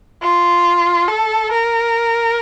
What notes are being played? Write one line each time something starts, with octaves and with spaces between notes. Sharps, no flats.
F4
A4
A#4